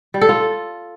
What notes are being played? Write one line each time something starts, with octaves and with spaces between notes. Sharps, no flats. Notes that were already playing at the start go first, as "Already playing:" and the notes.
G3
A4
F4